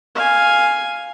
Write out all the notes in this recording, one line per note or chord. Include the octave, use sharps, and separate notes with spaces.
F5 G#5